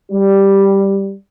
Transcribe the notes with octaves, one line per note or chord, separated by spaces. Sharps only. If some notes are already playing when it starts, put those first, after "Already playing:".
G3